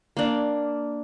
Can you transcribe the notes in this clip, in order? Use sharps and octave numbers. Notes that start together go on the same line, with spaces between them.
A#3 D4